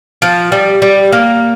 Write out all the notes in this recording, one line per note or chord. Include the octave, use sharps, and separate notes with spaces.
F3
G3
G3
A#3